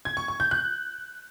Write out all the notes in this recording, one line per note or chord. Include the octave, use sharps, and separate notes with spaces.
G#6
C#6
C#6
G6
F#6